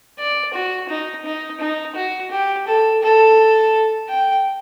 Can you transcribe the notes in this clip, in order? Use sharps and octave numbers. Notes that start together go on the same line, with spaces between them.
D5
F#4
D#4
D#4
D#4
F#4
G4
A4
A4
G5